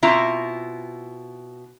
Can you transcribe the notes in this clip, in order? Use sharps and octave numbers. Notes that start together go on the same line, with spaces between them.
B2 C4 E4 F4 A#5